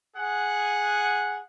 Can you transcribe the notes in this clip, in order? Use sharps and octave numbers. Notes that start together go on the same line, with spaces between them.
G#4 F#5